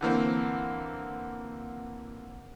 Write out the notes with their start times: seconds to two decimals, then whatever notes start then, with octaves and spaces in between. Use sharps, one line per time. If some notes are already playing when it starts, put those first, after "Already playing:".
0.01 D3 E3 A#3 C4